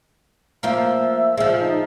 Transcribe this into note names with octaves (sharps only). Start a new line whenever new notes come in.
F3 A#3 F4 E5
F3 G#3
D#4